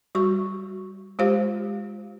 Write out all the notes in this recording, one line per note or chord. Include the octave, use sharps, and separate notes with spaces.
G3 F#4 C#6
G#3 F4 G4 C5 F5